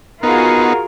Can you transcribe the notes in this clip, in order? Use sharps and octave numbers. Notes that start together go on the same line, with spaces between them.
B3 D#4 F4 F#4 G#4 A#4